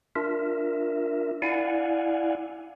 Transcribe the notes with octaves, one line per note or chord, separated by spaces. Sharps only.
D4 F4 A#4 E5
E4 D5 F5 F#5 G#5